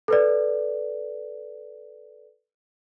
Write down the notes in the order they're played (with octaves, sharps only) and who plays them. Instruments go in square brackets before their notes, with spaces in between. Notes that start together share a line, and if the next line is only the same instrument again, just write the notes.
[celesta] A4 B4 D5